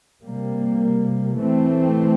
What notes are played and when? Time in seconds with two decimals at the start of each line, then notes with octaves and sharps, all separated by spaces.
0.24 C3 G3 A#3
1.37 E3 A3 C4